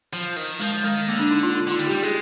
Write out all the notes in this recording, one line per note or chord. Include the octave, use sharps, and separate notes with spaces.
F3
D#3
F3 G#3
D#3 G#3
D3 A#3
D4
D#4
F4
D#4
D3 F4
G3
G4
G3
G#3 G#4